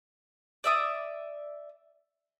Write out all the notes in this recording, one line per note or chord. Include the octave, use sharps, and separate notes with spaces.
D5 E5 D#6